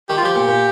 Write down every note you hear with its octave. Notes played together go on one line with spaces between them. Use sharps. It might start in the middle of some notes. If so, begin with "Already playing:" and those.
D#3 G4
F4
F3 G4
A#2
A#2